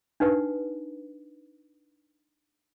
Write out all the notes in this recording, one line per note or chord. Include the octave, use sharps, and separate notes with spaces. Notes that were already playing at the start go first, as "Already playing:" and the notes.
D4 D#4 B4 F#5